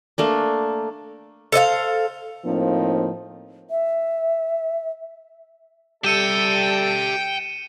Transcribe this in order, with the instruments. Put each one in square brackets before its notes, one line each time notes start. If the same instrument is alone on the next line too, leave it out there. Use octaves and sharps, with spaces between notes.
[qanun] A3 A#3 D4
[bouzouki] A4 C5 D#5 F5
[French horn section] A2 F3 A#3 C4 D#4
[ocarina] E5
[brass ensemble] G3 A4 [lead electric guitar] G4 E5 [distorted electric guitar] G5 [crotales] C#7 D#7 E7